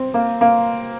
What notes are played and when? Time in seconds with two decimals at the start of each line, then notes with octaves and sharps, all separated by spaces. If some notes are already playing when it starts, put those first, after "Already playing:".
Already playing: C4
0.14 A#3
0.41 A#3